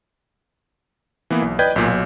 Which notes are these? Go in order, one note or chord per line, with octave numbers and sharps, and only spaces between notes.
E3 A#3 B3 E4
B1
B4 D5 D#5 G5 G6 G#6
B1 A#2
B1